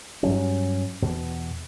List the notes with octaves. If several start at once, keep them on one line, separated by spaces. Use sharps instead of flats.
G2 F#3 C#4
E2 B2